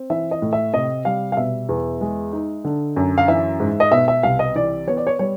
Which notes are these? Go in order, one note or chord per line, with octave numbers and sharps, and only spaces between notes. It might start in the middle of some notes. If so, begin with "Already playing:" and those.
Already playing: C4
E3 E5
D#5
A2
E5
C3 D#5
G3 F5
F5
B2 E5
E2
G#3
D#4
D3
F#2
F5
E3 E5
G#2
D#5
B2 E5
E5
C2 F5
D#5
E3 D5
B3 C#5
D5
C#5
G3 C#5